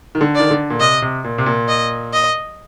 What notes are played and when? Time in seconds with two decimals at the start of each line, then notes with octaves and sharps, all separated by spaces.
0.15 D#3
0.21 D3
0.35 D#3 D5
0.51 D3
0.70 A#2
0.80 C3 D#5
1.02 C3
1.24 A#2
1.38 C3
1.46 A#2
1.68 D#5
2.13 D#5